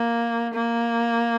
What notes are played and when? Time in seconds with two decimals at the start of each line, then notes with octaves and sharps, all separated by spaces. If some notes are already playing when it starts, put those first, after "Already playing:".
Already playing: A#3
0.54 A#3